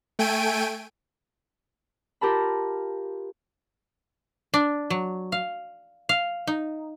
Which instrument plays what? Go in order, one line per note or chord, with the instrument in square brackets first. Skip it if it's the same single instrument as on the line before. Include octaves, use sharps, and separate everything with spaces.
[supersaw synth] A3 G5 G#5 D7 D#7
[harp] F4 G4 A#4 A5 B5
[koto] D4
F#3
F5
F5
D#4